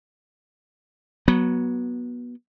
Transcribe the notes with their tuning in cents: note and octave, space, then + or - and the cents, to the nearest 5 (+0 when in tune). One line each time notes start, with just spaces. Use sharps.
F#3 +0 B3 -25